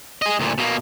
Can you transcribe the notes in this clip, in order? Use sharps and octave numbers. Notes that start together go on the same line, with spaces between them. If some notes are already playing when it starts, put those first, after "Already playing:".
G#4 D#5
D2 A#2
B2 A#3